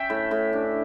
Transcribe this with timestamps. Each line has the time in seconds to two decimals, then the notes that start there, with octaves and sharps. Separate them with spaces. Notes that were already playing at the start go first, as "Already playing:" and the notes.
Already playing: C#4 E5 G5
0.10 A2
0.31 A2
0.53 D4